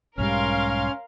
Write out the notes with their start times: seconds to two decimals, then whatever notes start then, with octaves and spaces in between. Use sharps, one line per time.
0.18 B1 G#2 G3 C#4 A#4 F5 C6 F6